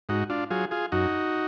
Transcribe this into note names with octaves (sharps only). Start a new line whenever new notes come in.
G#2 D#4 F#4
D4 F4
F#3 F4 G#4
F4 G#4
F#2 D#4 F#4